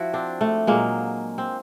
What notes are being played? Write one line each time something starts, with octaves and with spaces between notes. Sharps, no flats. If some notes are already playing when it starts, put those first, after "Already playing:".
Already playing: F3 E4 F#4
C4 D4
A3
A#2 F#3 G#3 A#3
C4